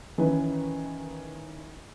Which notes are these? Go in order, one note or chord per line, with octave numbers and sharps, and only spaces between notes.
D#3 E3 C#4 B4